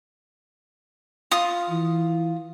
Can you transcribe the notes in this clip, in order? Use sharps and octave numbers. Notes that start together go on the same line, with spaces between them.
F4 D#6
E3